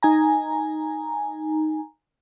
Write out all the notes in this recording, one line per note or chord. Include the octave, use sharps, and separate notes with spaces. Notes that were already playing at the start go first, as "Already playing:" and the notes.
D#4 G#5 A#5